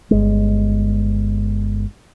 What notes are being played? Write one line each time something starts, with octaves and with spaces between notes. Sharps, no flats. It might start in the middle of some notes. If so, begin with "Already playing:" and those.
G1 G#3